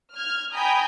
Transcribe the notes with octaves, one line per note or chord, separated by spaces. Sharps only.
F6 G#6
G5 G#5 A#5 B5 D#6 G6